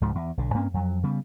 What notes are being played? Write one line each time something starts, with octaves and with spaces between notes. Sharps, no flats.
C#2 G#2 C#3 F3
E2
B1 D3
G2 A#3 C4 C#4
F2 F#3
C#3 G3 B3